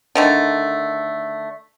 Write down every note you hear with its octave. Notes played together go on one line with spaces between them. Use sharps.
D3 D#3 A3